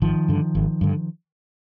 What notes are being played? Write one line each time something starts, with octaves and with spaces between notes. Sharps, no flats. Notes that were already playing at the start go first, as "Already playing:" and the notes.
G#1 D#3 F3
G2 D3
G#1
G2 D3